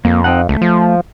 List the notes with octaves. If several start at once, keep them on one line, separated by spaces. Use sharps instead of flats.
F2 A#3
C4 D#4 F#5
C#2 A3
F3